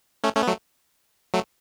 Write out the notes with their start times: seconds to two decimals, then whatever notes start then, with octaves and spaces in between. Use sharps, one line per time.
0.24 A3 C#4
0.36 A3 C#4
0.42 B3
0.47 F#3 A3
1.34 F#3 A3